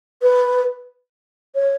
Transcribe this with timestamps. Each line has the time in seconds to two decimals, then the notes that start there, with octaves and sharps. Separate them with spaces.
0.22 B4
1.55 C#5